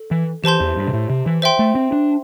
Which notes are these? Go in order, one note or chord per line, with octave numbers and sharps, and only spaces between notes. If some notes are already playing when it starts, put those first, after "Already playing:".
Already playing: A4
E3
E3 G4 C5 A5 C6 G6
E2
G2
C3
A2
C3
E3
C5 E5 G5 C6
A3
C4
D4